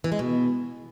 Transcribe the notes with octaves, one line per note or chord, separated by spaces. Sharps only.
E3
G#3
B2